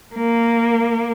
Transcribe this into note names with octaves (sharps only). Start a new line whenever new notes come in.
A#3